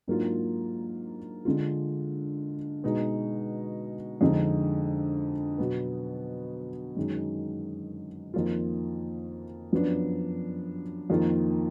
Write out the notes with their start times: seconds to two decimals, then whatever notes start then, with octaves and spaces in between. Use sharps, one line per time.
0.08 G#2 F#3 A#3 D4 F4
1.45 D3 G#3 D4 F4
2.84 B2 G#3 D#4
4.21 F2 D3 G#3 D#4
5.58 B2 F#3 B3
6.96 F#2 D#3 G#3
8.34 F2 D#3 A#3 F4
9.73 F#2 F3 B3 D4
11.10 F2 D#3 A#3 F4